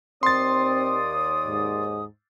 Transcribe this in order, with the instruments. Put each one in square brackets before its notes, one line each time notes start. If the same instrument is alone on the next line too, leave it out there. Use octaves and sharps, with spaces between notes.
[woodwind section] D#2 D5 D#6 [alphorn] C4 [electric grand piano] C6 A6
[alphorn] G#2